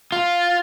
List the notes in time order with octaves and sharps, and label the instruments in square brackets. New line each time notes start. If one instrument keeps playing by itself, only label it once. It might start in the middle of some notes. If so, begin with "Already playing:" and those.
[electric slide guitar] F4